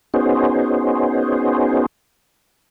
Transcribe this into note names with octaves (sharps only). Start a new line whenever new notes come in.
B3 C#4 D#4 F#4 G#4 C5